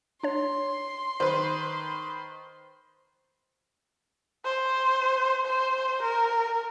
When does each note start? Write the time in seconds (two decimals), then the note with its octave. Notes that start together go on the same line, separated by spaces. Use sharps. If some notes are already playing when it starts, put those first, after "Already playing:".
0.23 D4 C#5 C6
1.20 D#3 B4 C5
4.45 C5
5.45 C5
6.03 A#4